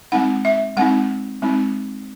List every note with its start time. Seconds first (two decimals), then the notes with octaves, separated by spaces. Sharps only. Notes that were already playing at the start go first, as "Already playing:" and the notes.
0.12 G#3 C4 D#4 F#5
0.45 E5
0.77 G#3 C4 D#4 F#5
1.42 G#3 C4 D#4